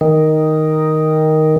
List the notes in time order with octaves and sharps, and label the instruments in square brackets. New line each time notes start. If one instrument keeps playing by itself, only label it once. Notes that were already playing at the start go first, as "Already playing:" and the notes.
[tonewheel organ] D#3